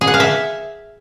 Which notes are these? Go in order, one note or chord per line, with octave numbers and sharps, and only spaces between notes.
G#4
F#5
F5
E5